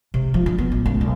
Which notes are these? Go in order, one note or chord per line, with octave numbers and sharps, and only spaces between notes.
C3
F3
D3
B3
A1
C#2
B1